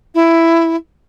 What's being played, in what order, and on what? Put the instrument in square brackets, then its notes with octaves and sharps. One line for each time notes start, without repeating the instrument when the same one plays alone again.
[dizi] E4